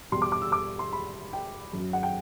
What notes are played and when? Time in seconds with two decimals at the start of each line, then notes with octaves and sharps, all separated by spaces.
0.12 E2 B2 G3 C6
0.22 D6
0.32 D6
0.42 E6
0.52 D6
0.79 C6
0.93 B5
1.33 G5
1.73 F#2
1.78 F#3
1.93 F#5
2.03 G5